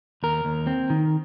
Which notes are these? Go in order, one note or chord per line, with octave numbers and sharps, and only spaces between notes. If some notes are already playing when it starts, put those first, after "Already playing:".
D#2 A#4
D#2
C4
D#3